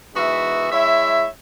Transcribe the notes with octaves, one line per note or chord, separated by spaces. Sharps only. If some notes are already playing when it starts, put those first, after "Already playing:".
G#2 E3 B3 F#4 E5
G#3 E4 C#5 E5